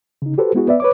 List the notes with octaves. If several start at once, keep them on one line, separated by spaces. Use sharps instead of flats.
C#3 D#4
F#4 G4 A4 B4 C5
G#3 B3 E4 F#4 G#4
B3 B4 D5 E5
B4 C#5 D6